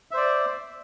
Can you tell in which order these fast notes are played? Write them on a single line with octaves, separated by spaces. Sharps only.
E5 C5 D5